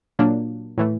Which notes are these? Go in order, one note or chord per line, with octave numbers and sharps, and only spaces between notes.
A#2 F#3 A#3 D4
A2 E3 A3